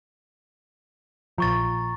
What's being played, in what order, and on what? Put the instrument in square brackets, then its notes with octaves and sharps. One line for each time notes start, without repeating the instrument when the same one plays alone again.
[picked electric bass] A#1 F3 [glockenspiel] A#5 C#6 A6